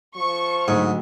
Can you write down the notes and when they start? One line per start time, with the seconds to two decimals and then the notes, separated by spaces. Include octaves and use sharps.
0.16 F3 C#6
0.68 D2 G#2 F#3